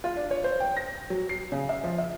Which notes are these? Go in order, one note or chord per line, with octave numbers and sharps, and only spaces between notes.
F4
D4
C#5
C5
G5
A#6
F#3
C7
C#3
E5
F3
E5